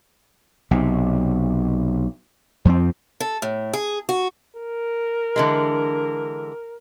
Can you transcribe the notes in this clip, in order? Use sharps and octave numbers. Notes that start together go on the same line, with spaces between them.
B1 C3
F2 F3 A3 C4
A4
A2
G#4
F#4
A#4
D3 E3 G#3